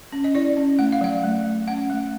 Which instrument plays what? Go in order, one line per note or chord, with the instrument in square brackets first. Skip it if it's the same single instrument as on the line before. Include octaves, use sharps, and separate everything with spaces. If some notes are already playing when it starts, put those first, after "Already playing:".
[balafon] C#4
D#5
E4 D5
C#4
A3 F#5
F5
F#3 F#5
A3
A3
C#4 F#5
A3